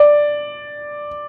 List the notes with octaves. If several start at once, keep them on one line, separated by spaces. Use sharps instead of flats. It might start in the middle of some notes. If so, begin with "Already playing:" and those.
Already playing: D5